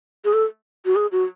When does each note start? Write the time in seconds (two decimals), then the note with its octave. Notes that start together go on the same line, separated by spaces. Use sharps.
0.25 G#4
0.33 A4
0.85 F#4
0.96 G#4
1.12 F#4